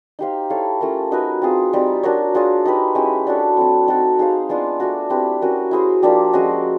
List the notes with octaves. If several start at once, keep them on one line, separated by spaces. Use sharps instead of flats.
D#4 G4 C5 F5
E4 A4 C#5 F5
A3 C#4 F4 A#4
D#4 F#4 B4 E5
C4 F4 G#4
G3 C4 D#4
D4 F#4 A#4 C#5
D4 F4 G#4 C#5
D#4 G4 B4
G#3 C#4 E4 G4
D4 F#4 A4 C#5
F#3 A3 C4
C4 D#4 F#4 A4
D#4 G#4 C5 F5
G#3 B3 D4 F4
A3 D4 F#4
C4 E4 G4 B4
C#4 F#4 A#4
E4 G#4 C5
F3 A#3 D4 G4
F3 G#3 C#4 F#4